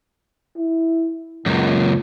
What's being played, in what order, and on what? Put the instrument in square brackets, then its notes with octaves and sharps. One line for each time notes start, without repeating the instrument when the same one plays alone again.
[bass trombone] E4
[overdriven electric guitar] C#2 F#2 [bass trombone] A#2